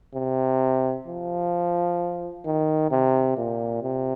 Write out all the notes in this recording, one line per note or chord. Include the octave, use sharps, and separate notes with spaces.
C3
F3
D#3
C3
A#2
C3